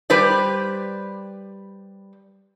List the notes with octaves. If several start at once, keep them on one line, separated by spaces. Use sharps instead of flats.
G3 G4 B4 C5 D5